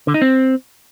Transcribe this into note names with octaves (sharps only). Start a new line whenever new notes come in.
D3
D#4
C4